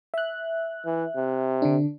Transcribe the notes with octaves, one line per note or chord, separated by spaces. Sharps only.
E5 F#6
E3
C3
D3 D4